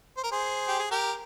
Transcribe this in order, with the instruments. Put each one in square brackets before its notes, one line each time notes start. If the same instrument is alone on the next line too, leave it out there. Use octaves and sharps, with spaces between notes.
[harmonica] C5
A#4
G#4 C5
G4
G#4
G4 A#4